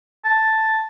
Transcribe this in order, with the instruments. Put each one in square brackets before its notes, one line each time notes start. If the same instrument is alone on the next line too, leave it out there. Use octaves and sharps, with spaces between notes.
[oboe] A5